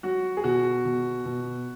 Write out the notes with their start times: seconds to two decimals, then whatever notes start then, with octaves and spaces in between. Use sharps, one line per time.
0.03 F#3 F#4
0.37 G#4
0.44 B2 F#4
0.85 B2
1.25 B2